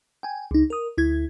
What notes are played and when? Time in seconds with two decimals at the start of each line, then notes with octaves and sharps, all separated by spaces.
0.23 G5 G#5
0.51 C#2 D#4
0.70 A#4 D#6
0.98 D2 E4 G#6